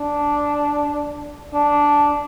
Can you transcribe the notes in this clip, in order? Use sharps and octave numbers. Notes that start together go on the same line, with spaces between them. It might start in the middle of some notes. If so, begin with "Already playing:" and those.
Already playing: D4
D4